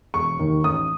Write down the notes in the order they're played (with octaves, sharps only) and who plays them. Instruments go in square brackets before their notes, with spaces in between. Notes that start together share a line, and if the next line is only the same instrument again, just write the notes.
[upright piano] E1 C#6
D#2 D#3
A1 D#6